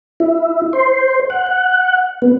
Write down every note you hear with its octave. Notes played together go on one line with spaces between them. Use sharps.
E4
C5
F#5
F#5
B3